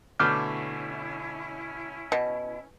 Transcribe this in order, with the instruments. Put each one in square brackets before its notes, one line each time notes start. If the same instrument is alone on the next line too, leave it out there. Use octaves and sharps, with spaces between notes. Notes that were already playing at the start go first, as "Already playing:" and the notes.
[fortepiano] B2 D3 A3 [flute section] C#4 E4 [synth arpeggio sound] D6 F6 G6
[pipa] B2